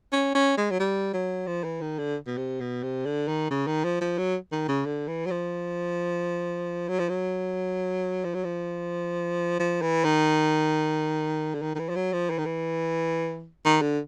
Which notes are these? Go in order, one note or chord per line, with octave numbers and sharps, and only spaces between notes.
C#4
C#4
G#3
F#3
G3
F#3
F3
E3
D#3
D3
B2
C3
B2
C3
D3
D#3
C#3
D#3
F3
F3
F#3
D#3
C#3
D3
E3
F#3
F3
F#3
F3
F#3
F3
F#3
F3
F3
E3
D#3
D3
D#3
D#3
E3
F3
F#3
F3
E3
D#3
E3
D#3
D3